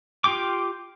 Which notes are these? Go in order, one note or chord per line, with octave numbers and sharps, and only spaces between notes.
F4 G4 G5 D6